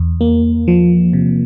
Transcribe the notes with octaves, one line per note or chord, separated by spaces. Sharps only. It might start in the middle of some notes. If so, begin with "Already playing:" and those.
Already playing: E2
A#3
F3
C3